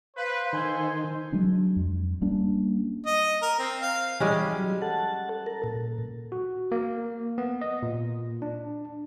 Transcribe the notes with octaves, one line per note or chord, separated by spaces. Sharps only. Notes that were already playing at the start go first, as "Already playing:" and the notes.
B4 C5 F5
D#3 A4 G#5 C6
F#3 G#3 D4
F2
G3 A#3 C#4 D4
D#5
A#4
C4
F5
E3 G3 G#3 C#4
F#3
A4 F#5 A5
A4 A#4
A#2
F#4
A#3
B3
D#5
A#2
D4